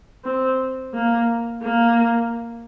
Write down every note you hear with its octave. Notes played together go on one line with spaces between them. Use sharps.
C4
A#3
A#3